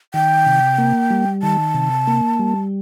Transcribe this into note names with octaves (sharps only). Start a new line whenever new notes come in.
D#3 G5
C3
A#3
G3
D#3 A5
C3
A#3
G3